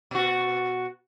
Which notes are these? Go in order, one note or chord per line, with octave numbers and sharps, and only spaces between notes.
B2 F#4